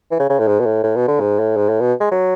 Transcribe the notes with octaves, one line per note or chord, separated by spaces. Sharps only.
E3
C#3
C#3
A2
G#2
B2
A2
A2
B2
D3
G#2
A2
G#2
A2
B2
G#3
F#3